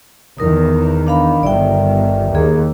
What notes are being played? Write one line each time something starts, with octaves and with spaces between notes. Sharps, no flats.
E2 D#3 A#4 D#6
D4 F5 B5
G1 D#3 D5 E5 G5
D#2 G#4